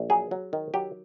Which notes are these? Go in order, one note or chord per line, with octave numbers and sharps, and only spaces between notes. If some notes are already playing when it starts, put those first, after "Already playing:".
Already playing: A#1
F#3 G#4
F#3
D#3
F#3 G4